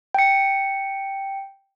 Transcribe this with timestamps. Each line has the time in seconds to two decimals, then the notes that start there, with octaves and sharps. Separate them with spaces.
0.14 G5 C#7